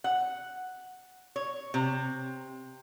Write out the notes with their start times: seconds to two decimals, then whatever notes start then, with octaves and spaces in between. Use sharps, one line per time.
0.04 F#5
1.36 C#5
1.74 C3